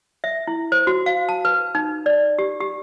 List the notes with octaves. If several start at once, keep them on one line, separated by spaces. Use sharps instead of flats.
E5
E4
C5
F#4
F5
A5
B4
D#4
D5
G4
G4